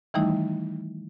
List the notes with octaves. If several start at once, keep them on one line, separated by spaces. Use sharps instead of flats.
D#3 E3 G3 A3 D#4 E4